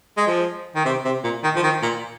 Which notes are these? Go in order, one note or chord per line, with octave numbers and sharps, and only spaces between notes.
G#3
F3
D#3
C3
C3
A#2
D#3
F3
D#3
A#2